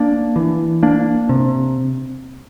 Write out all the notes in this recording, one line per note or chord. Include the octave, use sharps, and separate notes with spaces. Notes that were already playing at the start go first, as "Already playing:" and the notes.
Already playing: A#3 D4
E3
A#3 D4
C3